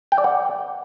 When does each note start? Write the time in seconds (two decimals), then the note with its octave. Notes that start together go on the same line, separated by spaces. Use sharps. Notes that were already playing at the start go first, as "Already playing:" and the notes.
0.12 G5
0.18 D5
0.24 F#5